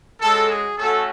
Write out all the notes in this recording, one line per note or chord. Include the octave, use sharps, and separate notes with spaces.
G#3 C#4 F#4 A4
G#4
A3 C#4 F#4 A4